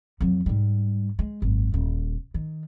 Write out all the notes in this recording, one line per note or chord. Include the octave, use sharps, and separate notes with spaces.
F2 F#3
G#2 G3
G#3
G#1 F#2
D#1
D#3